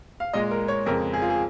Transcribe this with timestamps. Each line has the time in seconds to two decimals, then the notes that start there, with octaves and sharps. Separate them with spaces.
0.20 F5
0.33 A#2 G#3 D#5
0.51 A#4
0.68 C#5
0.86 F2 C#3 G#3 A#4
1.14 G#4
1.22 F4
1.30 G#4